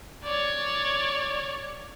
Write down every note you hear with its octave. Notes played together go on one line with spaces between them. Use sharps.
C#5 D5